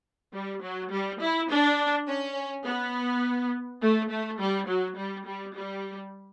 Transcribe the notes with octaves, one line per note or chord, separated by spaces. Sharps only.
G3
F#3
G3
E4
D4
C#4
B3
A3
A3
G3
F#3
G3
G3
G3